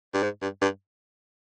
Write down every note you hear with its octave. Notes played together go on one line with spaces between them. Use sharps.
G2
G#2
G2
G2